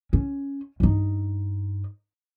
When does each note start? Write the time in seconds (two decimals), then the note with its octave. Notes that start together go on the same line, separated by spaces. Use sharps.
0.13 C#4
0.80 G2 D#4